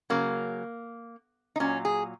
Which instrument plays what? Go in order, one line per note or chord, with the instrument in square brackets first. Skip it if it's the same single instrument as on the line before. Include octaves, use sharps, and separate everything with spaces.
[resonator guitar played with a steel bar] C#3 F#3 A#3
D#4
A#2 F#3 C#4
G#4